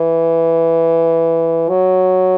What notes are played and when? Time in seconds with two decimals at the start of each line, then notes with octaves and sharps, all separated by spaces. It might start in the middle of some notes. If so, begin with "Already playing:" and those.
Already playing: E3
1.69 F#3